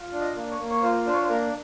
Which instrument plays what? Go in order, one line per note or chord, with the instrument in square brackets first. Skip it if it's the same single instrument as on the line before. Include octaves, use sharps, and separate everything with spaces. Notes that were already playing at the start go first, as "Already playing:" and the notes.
Already playing: [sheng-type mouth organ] F4
D4
D#5
A#3
C#5
A#3
C#5
F4 C5
D4 C5
C#5
C5
A#3 A#4